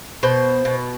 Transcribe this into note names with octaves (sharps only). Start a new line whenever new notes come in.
B2 C5
B2